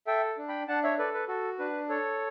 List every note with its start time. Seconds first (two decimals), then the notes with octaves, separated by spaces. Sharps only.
0.07 A4 E5 G5
0.38 D4
0.48 G5 B5
0.68 D4 F#5 A5
0.84 C#5 E5
0.98 A4 B4 D5
1.14 B4
1.28 F#4 A4
1.59 D4 B4
1.89 A4 C#5